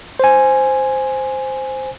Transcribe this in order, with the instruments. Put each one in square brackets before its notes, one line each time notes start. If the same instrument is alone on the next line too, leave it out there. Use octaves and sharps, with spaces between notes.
[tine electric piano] C5 G#5